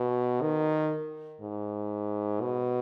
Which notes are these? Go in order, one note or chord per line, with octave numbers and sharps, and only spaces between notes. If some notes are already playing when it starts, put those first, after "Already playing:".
Already playing: B2
D#3
G#2
B2